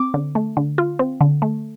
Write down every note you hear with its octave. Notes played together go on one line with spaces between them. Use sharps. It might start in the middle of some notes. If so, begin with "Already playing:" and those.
Already playing: C4 D6
D3
A3
D3
F4
C4
D3
A3